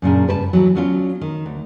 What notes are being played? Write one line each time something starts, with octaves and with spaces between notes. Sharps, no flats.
F#2 A#2 C#3 D4
G2 B4 C5 A5
D#2 E3 F#3
F#3 B3 C#4 D4 F4
D#3
D2